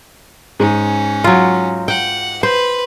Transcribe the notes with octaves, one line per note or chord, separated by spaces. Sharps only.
G#2 C#4
F#3 F4
F#5 G5
B4 C5